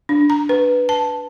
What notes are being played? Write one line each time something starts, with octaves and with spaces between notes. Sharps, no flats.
D4
A#5
B4
A5